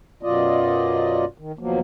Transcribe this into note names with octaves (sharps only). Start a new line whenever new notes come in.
F#2 B2 F#3 F4 D5 D#5
D#3
D#2 B2 F3 F#3 A#3